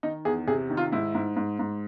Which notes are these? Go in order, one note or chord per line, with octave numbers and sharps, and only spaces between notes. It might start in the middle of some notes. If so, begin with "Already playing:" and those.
D#3 D#4
E2 G#4
C3 G#4
D#3
F4
G#2 E4
G#2
G#2
G#2